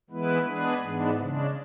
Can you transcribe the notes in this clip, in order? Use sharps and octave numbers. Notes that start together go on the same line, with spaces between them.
E3 G#3 B3 E4 B4
G#3 B3 D4 G#4 B4
G#2 E3 G#3 B3 D4
C#3 G#3 D4